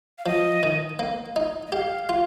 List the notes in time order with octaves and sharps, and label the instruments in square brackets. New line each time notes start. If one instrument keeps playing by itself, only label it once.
[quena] F5
[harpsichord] F3 [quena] D#5
[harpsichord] D#3
A#3
D#4
[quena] D#5
[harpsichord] G4 [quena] F5
[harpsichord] F4